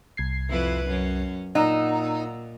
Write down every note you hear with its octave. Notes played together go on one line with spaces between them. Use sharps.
C2 G#6 C7
F2 E4 B4
F#2 C#4
A#2 D#4 F#5 A#5 E6